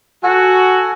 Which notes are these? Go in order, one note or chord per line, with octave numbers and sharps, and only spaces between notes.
F#4 A4 G#5